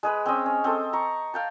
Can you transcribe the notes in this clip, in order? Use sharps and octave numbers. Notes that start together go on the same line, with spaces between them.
G#3 G#4 B4
C4 C#4 D#5
C#4
C4 A4
A#5 C#6
F5 G5 A5